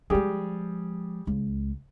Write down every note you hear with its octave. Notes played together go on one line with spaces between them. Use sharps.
F3 G3 G#3 G4 G#4
C#2